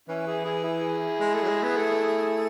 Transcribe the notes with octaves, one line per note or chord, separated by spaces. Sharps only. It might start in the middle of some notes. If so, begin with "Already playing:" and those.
E3 C#4 E4
E4 G#4
E4 G#4
E4 G#4
G#3
A3
F#3
G#3
B3
A3